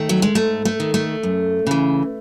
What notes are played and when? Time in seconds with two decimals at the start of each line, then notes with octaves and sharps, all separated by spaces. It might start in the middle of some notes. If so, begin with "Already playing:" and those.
Already playing: D#3 A3
0.09 F#3
0.22 G#3
0.35 G#2 A3
0.65 A3
0.80 D#3
0.94 A3
1.23 F#2
1.67 C#3 E3